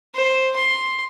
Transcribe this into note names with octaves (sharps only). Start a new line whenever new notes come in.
C5
C6